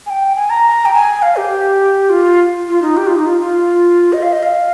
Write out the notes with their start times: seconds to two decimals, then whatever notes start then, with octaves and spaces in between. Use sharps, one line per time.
0.06 G#5
0.10 G5
0.35 G#5
0.50 A#5
0.85 G5
0.94 G#5
1.22 F5
1.38 G4
2.10 F4
2.68 F4
2.82 D#4
2.97 G4
3.07 F4
3.16 D#4
3.26 F4
3.41 F4
4.13 D#5
4.23 F5
4.32 D#5
4.43 F5